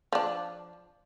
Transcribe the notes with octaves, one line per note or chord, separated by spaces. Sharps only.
F3 D4